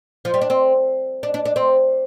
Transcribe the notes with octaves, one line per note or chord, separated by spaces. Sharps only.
F3
G3
D4
C4
D4
D4
D4
C4